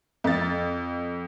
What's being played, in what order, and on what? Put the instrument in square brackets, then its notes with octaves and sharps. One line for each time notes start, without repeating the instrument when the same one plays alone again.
[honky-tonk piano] F2 A6